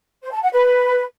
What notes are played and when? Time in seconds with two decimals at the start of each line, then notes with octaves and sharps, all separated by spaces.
0.23 C5
0.33 A5
0.42 F#5
0.52 B4